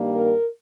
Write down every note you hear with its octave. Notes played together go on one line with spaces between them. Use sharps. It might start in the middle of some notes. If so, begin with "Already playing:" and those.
Already playing: G2 D#3 G3 A#3
A#4